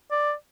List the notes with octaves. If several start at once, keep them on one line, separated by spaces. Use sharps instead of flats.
D5